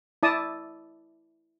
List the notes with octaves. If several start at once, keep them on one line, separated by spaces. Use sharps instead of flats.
E4 D5 A5 D#6